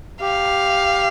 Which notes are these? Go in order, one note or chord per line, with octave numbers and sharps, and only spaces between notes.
G4 F5